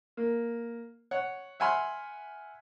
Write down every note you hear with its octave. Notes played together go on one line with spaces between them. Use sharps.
A#3
C#5 F#5
E5 F#5 G#5 B5 C6 F6